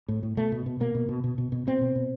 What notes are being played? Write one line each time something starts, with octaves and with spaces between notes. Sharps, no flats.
A2
A2
B2 A3
B2
B2
B2 A#3
B2
B2
B2
B2
B2
B2 C4
B2
B2